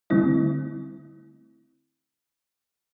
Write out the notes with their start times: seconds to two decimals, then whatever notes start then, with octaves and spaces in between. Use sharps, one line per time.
0.10 D3 G3 A3 C4 E4 D#5